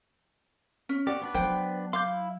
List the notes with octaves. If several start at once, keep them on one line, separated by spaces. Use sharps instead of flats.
C#4
F#4 G4 D5
B3 D4 B4
F#3 C5 G5
F5 C6 D6 G6
E4